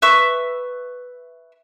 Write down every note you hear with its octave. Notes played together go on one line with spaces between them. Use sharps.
B4 E5 C#6 E6